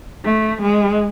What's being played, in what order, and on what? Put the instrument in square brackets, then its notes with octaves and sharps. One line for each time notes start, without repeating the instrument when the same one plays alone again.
[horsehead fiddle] A3
G#3